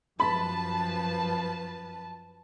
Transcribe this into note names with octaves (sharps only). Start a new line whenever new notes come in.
F#2 F3 B4 A5 B5